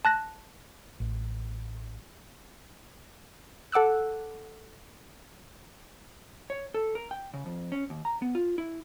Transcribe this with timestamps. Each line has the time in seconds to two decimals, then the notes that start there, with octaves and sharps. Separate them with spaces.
0.05 A5 F#6 A#6
1.00 A1
3.72 A4 F#5 D6 E6 F#6
6.50 C#5
6.74 A4
6.95 A#4
7.11 G5
7.34 C#3
7.46 F2
7.72 C#4
7.90 D#2
8.05 A#5
8.22 B3
8.35 F4
8.58 E4